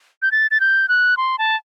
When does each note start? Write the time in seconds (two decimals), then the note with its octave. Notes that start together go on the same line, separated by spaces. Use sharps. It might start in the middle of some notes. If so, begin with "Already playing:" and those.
0.22 G6
0.32 A6
0.51 A6
0.60 G6
0.89 F#6
1.17 C6
1.39 A5